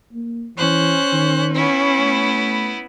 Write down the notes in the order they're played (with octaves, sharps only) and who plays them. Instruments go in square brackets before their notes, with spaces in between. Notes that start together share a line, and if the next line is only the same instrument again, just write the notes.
[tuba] A#3
[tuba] E3 [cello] C#4 [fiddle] C5 F#6
[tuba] D#3
[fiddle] B3 E4 [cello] C#4
[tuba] A3